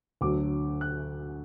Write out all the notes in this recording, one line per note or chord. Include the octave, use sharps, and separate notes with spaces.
D2 D3 F#3 D6
F#6